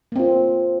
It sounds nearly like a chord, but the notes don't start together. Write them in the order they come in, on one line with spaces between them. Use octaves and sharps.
A#3 C4 F4